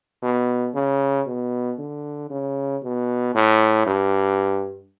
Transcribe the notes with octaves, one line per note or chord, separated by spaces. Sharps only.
B2
C#3
B2
D3
C#3
B2
A2
G2